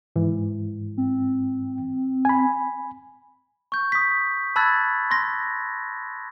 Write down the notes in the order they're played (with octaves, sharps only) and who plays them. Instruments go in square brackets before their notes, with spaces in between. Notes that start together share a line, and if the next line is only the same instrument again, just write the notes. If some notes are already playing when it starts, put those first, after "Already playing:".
[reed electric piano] G#2 E3
[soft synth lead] C4
[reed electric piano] G#5 B5
[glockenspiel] C#6 G6
D#6 B6
A5 B5 E6 F#6 G#6 A6
C6 A#6